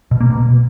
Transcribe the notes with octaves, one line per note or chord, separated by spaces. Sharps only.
B2
A#3
B2